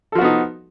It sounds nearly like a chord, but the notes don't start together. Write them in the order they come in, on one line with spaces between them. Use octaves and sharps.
A4 F3 F#4 B3 D#4